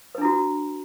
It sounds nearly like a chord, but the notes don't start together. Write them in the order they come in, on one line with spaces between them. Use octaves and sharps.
B4 D4 E4 F#4